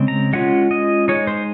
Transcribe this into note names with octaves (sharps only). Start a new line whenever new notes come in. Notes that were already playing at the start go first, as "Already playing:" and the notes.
Already playing: C#3 G#3 C4
A#5
G#3 C#4 F4 F#5
D#5
G#3 D#4 C#5
C5